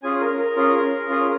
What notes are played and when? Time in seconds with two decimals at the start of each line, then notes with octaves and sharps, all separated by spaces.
0.03 C#4 F4 G#4 G#5
0.21 A#4
0.39 A#4
0.56 C#4 F4 G#4
1.09 C#4 F4 G#4